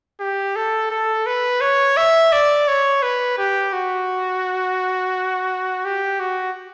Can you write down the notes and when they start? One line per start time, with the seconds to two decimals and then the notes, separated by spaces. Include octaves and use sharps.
0.20 G4
0.56 A4
0.91 A4
1.26 B4
1.61 C#5
1.97 E5
2.32 D5
2.68 C#5
3.02 B4
3.38 G4
3.73 F#4
5.85 G4
6.20 F#4